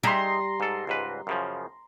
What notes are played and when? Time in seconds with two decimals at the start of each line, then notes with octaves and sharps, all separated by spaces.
0.03 G3 D#4 G4 G#4 E5 A#5 C6
0.60 G#2 A4
0.87 C#2 G#2 B4
1.27 F#2 C#3 F3